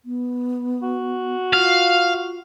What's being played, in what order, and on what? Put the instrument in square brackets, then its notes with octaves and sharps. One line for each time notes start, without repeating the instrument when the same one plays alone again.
[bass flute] B3
[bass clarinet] F#4
[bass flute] F4 [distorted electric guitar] F5